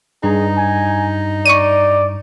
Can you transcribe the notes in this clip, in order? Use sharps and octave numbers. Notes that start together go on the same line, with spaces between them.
G2 D#4 G#4 A#5
G#5
D5 C#6 D#7